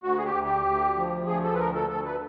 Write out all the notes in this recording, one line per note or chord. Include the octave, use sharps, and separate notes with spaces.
D2 F#4
G#4
G4
D2
G4
D2
F3
D2 G#4
A4
B4
D2 A#4
A4
D2 A4
B4